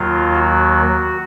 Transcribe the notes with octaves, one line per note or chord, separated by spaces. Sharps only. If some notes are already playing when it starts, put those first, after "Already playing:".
Already playing: D#2 D#3 F#3 F4
F#4